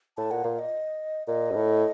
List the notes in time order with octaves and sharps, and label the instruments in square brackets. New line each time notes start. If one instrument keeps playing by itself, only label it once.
[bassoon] A2 [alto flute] A5
[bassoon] A#2 [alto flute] F#5
[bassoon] A#2 [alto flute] F5
[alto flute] D#5
[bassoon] A#2 [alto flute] D#5
[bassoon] F#2
A2